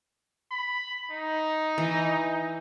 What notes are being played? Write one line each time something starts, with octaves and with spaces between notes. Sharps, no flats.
B5
D#4
E3